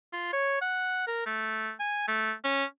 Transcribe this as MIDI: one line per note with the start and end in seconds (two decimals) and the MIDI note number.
0.13 0.29 65
0.33 0.59 73
0.61 1.05 78
1.07 1.25 70
1.26 1.71 57
1.80 2.07 80
2.08 2.33 57
2.44 2.65 61